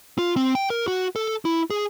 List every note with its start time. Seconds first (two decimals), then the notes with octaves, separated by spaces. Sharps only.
0.18 F4
0.37 C4
0.55 G5
0.70 A#4
0.88 F#4
1.16 A4
1.45 E4
1.70 G#4